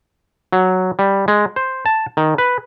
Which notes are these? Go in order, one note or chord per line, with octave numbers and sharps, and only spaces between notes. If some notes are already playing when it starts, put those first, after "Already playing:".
F#3
G3
G#3
C5
A5
D#3
B4